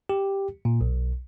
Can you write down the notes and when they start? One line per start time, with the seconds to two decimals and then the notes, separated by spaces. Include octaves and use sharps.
0.09 G4
0.65 A#2
0.81 B1